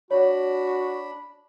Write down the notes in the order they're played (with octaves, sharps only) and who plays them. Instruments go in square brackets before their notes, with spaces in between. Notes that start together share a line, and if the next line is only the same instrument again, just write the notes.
[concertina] D4 B5 [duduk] F#4 [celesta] C#5